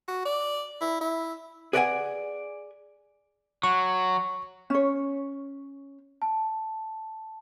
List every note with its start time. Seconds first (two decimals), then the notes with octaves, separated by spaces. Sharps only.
0.08 F#4
0.25 D5
0.81 E4
1.01 E4
1.73 G#4 B4 D5 D#5 F#5 G#5
3.63 F#3 C#6
4.70 C#4 C#5
6.22 A5